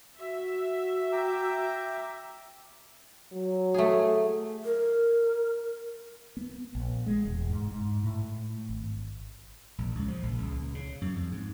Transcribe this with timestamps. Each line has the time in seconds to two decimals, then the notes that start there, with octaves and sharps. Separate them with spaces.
0.20 F#4 E5
1.12 G5 A#5 D6
3.33 F#3
3.74 A3 G#4
4.65 A#4
6.37 B3
6.75 A#1
7.06 G#3
7.25 E1
7.49 G#2
7.71 G#2
8.03 A2
8.69 G#1
9.78 A#1
9.95 C#2
10.08 F3
10.23 A#1
10.42 C#2
10.75 C#3
11.01 F#2
11.17 F2
11.32 G#2